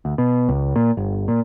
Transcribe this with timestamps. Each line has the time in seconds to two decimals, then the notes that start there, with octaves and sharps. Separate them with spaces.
0.05 D2
0.18 B2
0.49 C#2
0.76 A#2
0.97 G1
1.28 A#2